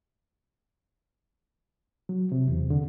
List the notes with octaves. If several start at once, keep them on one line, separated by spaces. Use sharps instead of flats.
F#3
C3
E2
D3